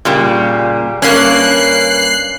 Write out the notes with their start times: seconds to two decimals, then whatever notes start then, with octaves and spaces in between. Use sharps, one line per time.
0.05 A#2 C#3 G3
1.02 G2 A#3 C#4 F#6 C7